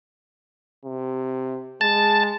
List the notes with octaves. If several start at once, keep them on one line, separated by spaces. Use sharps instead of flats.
C3
G#3 A5